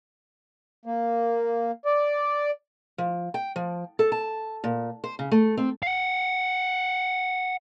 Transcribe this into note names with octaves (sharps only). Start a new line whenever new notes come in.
A#3
D5
F3
G5
F3
A4
A5
A#2
C5
C#3
A3
C4
F5 F#5